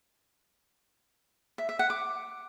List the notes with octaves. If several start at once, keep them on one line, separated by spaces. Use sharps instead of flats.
E5
E5
F#5
D6